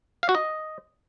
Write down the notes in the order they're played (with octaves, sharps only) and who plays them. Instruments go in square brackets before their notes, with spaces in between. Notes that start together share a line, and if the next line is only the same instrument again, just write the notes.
[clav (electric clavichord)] F5
F#4
D#5